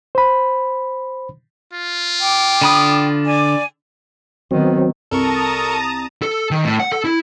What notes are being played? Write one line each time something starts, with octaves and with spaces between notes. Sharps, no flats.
C5 B5
F4
G5 D6
D3 B5 D#6
D5 G#5 D6
D#3 F#3 B3 C4
C2 A4 A#4 A5 A#5 C#6 D#6
A4
D#3
A2
F#5
A4
E4